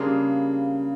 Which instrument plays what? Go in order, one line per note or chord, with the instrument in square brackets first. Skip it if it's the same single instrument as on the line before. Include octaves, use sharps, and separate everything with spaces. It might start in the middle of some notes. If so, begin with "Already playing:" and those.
Already playing: [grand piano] C#3 [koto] G3 A#3 D4 F4 G#4